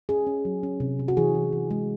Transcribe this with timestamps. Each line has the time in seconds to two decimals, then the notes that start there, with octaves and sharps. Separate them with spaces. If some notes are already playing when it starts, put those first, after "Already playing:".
0.09 C#4 G#4
0.27 C#4
0.45 F#3
0.63 C#4
0.80 C3
0.99 C3
1.08 F#4
1.17 E3 G#4
1.35 E3
1.53 E3
1.71 G#3